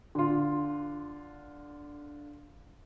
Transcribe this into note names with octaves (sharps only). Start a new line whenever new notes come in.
D3 F4